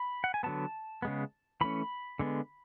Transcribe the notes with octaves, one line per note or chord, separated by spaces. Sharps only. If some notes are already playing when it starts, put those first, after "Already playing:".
Already playing: B5
F#5
G#5
D3 F#3 B3 A5
C#3 G#3 B3
E3 A3 C#4 B5
D3 G#3 B3